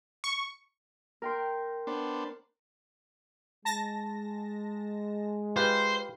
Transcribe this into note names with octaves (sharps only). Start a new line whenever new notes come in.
C#6
A#4 G5 C6
B3 D4 C5
G#3 A5 A#6
F4 G4 B4 C5